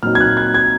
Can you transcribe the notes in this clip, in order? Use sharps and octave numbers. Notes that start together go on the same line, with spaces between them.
A#2 F#3 C4 D#4 F6
G#6
F#6
G#6
G#6